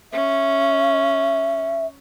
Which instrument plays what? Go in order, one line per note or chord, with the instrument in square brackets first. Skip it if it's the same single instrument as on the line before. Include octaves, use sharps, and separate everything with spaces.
[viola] C#4 [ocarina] E5